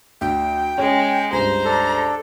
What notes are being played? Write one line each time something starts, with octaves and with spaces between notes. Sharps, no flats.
D2 G5
G#3 C#4
C#2 G2 C5 A#5
D4 A4